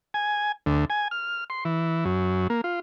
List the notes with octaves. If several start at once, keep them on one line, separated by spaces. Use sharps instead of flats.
G#5
D2
G#5
F6
C6
E3
F#2
A#3
F4